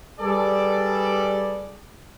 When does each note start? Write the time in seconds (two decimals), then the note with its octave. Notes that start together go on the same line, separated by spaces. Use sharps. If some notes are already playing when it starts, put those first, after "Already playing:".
0.19 G3 G#4 A4 B4 D5